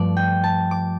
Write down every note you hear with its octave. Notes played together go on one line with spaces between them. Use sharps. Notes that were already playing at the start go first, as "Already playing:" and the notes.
Already playing: G2 F3 A3 D5
G5
A5
D6